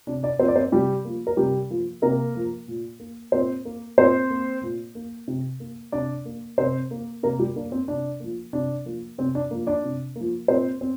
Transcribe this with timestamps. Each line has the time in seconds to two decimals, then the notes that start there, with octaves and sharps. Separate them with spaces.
0.07 C3 D4
0.23 D4 D5
0.39 F3 A#3 C4 C5
0.48 D5
0.56 C4 C5
0.72 C3 G3 G4
1.05 F3 A#3
1.27 A#4
1.37 C3 G3 G4
1.70 F3 A#3
2.02 C3 A#3 A#4
2.35 F3 A#3
2.68 A#2
3.00 A#3
3.32 A#2 C4 C5
3.65 A#3
3.98 A#2 C4 C5
4.30 A#3
4.62 A#2
4.95 A#3
5.28 C3
5.60 A#3
5.92 C3 D4 D5
6.26 A#3
6.58 C3 C4 C5
6.91 A#3
7.23 C3 A#3 A#4
7.39 G3 G4
7.56 A#3 D4
7.72 C4
7.88 C3 D4
8.20 F3 A#3
8.53 C3 D4
8.85 F3 A#3
9.18 C3 C4
9.35 D4
9.51 F3 A#3
9.67 D4 D5
9.84 C3
10.16 F3 A#3
10.48 A#2 C4 C5
10.81 C4